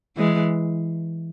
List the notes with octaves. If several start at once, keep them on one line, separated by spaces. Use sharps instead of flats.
E3 G#3